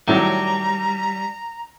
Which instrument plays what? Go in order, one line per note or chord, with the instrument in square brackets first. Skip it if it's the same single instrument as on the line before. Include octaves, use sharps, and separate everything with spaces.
[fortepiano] A2 D#3 F#3 [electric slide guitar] G3 [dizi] A#5